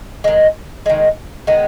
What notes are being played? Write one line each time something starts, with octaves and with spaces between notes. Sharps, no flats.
D#3 G#3
D#3 G#3
D#3 G#3 B3